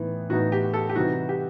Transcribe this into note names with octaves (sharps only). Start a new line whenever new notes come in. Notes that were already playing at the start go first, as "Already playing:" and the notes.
Already playing: A2 E3 B3 D#4
A2 E3 B3 D#4 F#4
G4
A4
G4
C3 E3 G3 C4 D#4 F#4
G4